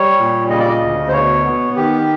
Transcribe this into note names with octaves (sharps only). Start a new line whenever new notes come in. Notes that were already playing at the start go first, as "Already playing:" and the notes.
Already playing: G3 C#5
A#2
C#3 D#5
D5
D#5
D2
C5
B2 C#5
B3
D#3 G4